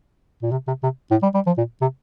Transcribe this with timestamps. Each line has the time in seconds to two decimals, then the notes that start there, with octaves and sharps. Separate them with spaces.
0.42 A#2
0.51 C3
0.67 C3
0.83 C3
1.11 A2
1.23 G3
1.34 G3
1.47 F3
1.58 A#2
1.81 C3